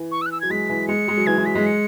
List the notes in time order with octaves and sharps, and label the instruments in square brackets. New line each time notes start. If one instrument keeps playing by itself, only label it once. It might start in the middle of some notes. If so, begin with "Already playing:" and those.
Already playing: [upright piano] E3
[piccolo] C#6
E6
F#6
E6
[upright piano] F#3 [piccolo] G#6
[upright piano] G#3 [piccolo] B6
[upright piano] E3
[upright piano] G#3 [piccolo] C#7
[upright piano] G#3
F#3
[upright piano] E3 [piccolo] G#6
[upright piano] E3
[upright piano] F#3 [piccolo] B6
[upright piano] G#3
[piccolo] C#7